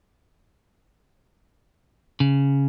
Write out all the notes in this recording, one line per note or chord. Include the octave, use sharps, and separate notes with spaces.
C#3